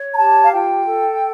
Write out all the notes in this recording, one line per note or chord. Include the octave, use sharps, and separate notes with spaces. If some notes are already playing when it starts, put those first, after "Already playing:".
Already playing: C#5
A#5
G4 A5
F5
F4 G5
A4